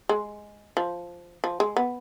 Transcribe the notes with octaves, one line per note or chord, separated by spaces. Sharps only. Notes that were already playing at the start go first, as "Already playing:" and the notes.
G#3
F3
F3
G#3
B3